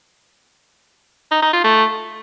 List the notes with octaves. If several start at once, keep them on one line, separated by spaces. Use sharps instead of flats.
D#4
D#4
F4
A3